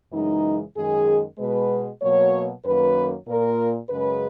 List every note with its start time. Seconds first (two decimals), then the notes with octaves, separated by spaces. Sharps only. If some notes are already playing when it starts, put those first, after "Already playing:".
0.13 F#2 C#3 E3 G#3 D#4
0.76 F#2 D#3 G#3 G#4
1.38 B2 G#3 B4
2.01 B2 F#3 A#3 C#5
2.65 F#2 D#3 F#3 A#3 B4
3.27 A#2 A#3 A#4
3.89 F#2 C#3 G#3 B4